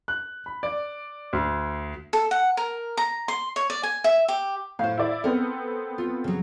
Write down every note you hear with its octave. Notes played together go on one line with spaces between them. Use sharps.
F#6
B5
D5
D2
A4
F#5
A#4
A#5
C6
C#5
D5
G#5
E5
G4
A2 C5 F5
E4 D5
B3 C4 A4 A#4
F4
C#3 F#3